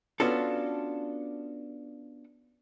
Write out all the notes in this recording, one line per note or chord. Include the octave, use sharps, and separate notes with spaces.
B3 C#4 D4 F4 F#4 A4